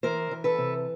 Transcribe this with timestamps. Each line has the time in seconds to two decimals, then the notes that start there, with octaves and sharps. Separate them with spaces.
0.03 E3 A#4 C5
0.31 E3
0.44 A4 B4
0.58 C3